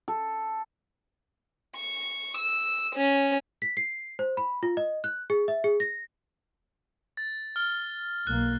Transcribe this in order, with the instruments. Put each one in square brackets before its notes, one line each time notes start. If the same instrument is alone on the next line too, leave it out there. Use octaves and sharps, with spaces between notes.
[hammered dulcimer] A4
[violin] C#6
E6
C#4
[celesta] B6
C7
C5
B5
F4
D#5
F#6
G#4
E5
G#4
A#6
[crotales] A6
F6 G7
[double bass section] B1 A#3 [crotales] F#6